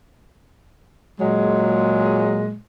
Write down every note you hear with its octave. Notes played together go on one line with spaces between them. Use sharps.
A#2 F#3 G#3